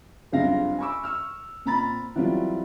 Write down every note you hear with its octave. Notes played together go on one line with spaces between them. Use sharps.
F#1 C#2 G2 C4 F5 A#6
G#5 B5 C#6 D6 E6
C#6 E6 F6
A#2 C4 A#5 B5 A6
E3 F#3 G3 C4 F4 F#4